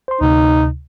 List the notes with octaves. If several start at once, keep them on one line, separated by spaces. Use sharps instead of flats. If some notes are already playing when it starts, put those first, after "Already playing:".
C5 C6
D2 C3 D#4